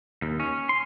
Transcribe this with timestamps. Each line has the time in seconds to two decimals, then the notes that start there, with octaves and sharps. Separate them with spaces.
0.22 D#2
0.40 C#4
0.69 C6